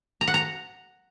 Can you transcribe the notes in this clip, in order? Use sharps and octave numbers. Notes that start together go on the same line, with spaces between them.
A#5
F#5
A#5